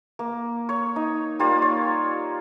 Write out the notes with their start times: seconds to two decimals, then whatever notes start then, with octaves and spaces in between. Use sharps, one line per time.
0.19 A#3
0.69 C#5
0.96 D#4
1.39 G3 A#3 F4
1.62 C#5